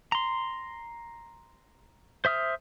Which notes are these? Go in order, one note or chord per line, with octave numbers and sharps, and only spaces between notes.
A#5 C6
C5 E5 D#6 F6